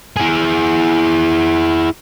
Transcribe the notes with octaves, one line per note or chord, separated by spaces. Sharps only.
E4 G#4